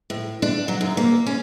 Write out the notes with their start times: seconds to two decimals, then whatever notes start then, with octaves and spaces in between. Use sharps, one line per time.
0.10 A2
0.42 D4
0.68 F#3
0.81 F#2
0.97 A#3
1.26 C#4